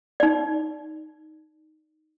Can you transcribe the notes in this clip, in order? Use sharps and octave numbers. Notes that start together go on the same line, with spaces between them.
D#4 D5